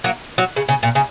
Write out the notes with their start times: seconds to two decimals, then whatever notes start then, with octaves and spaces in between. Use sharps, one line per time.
0.04 F#3 A#3
0.38 F#3
0.56 C#3
0.69 C#3
0.83 A#2
0.95 C#3